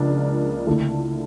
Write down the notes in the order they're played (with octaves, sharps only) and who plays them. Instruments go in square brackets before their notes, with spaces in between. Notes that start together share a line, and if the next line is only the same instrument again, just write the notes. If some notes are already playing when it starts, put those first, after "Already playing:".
Already playing: [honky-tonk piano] C#2 C#3 F3 A#3 D4
D3 A3 E4